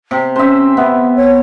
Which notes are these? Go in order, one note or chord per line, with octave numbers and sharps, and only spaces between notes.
C3
C#4 C5 E5
B3 E5
C#5